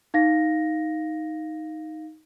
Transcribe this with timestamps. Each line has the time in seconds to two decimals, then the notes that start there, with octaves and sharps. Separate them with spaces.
0.14 D#4 F5 A#6